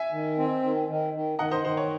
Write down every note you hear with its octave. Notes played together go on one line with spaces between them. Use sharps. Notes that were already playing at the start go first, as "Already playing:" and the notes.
Already playing: E5 G#5
D#3
C4
D#3
D#3
D#3
D#3 D#5 F#5
C5 D#5
D#3 C5
C#5